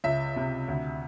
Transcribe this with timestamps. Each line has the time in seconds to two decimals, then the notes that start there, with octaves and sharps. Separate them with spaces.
0.04 C#2 E5
0.36 C3
0.68 D2